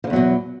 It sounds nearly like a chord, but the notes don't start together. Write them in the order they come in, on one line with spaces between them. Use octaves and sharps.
F3 D3 E2 F#3 B2